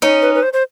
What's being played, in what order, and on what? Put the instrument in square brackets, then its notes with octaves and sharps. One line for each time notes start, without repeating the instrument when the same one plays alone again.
[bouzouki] C#4 D#4
[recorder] B4
B4
C5
C5